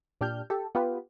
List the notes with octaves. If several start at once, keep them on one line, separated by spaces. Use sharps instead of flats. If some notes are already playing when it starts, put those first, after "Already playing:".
A#2 D4 G4 F6 G6
G4 A4
B3 F4 G4 B4